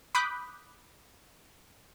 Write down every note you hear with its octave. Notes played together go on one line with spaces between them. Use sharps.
B5 D6 D#6 F#6 G6 B6